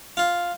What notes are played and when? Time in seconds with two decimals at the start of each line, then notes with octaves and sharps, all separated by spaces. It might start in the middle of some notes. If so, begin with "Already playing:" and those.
0.17 F4